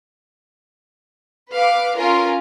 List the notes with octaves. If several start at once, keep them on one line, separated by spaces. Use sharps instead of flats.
B4 F5 D6
C#4 F4 A#4 G#5